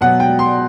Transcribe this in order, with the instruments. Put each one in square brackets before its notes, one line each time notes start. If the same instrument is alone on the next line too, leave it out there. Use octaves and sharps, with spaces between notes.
[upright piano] B2 F#3 B3 F#5
G5
C6